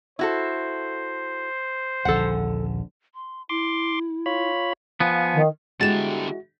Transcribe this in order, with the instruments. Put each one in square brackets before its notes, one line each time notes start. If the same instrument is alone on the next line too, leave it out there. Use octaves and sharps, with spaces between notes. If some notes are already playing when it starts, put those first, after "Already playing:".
[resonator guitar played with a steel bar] E4 F#4 A4 [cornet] C5
[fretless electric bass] D#1 A#1 D3 [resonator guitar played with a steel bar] A4 F#5
[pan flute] C6
[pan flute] E4 [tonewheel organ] C6 D6
[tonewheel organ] F4 C#5 B5
[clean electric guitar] F3 B3 [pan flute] F5 [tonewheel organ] G#5
[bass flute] D#3
[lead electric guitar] D3 G4 [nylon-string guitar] G#3 E4 [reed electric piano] F#4 [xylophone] A6 E7